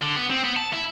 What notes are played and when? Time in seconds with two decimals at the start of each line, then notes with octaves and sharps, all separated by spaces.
0.02 D3
0.17 B3
0.30 C4
0.44 B3
0.57 A5
0.73 E4